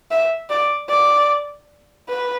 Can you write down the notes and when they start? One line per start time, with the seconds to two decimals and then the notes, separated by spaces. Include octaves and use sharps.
0.11 E5
0.50 D5
0.89 D5
2.09 B4